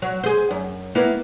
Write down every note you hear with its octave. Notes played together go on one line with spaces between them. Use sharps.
F#3
G#4 C5
F#2
A#3 B3 E4